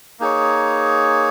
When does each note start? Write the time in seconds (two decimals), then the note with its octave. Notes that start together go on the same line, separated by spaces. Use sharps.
0.20 A#3 D#4 G#4 C#5